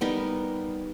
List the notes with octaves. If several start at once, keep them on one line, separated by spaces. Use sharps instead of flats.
G3 B3 D#4 A#4